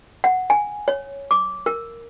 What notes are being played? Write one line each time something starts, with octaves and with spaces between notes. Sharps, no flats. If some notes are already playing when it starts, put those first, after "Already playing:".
F#5
G#5
C#5
D6
A#4